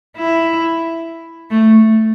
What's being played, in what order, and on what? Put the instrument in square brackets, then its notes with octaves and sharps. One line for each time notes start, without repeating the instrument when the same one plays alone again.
[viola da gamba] E4
A3